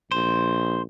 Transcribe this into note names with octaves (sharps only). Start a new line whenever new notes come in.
A#1 C5